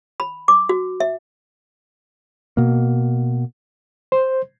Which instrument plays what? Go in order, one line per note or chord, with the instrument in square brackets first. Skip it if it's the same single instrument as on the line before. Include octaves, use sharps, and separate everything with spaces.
[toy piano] B5
D6
F#4
E5
[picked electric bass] B2 A#3
[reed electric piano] C5